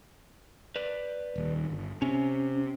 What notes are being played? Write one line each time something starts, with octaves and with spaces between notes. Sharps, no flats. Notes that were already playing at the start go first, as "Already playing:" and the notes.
B4 D5
D#1 D#2
G1
C3 C#4